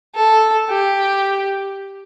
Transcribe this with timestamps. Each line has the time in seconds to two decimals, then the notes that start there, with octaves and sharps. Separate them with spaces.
0.15 A4
0.69 G4